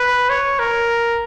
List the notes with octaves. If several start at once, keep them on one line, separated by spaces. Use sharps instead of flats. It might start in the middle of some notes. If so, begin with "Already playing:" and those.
Already playing: B4
C#5
A#4